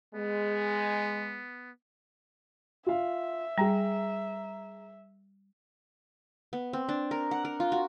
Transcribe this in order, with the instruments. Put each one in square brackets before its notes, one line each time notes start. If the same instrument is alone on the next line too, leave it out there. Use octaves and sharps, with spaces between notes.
[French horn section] G#3 [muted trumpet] B3
[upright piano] F4 F5 [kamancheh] E5
[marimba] G3 [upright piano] G#4 A#5
[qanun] B3
C4
D4
A#4
F#5
A#4
F4
F#4